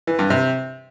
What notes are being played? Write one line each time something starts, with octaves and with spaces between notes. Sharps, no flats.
E3
G2
C3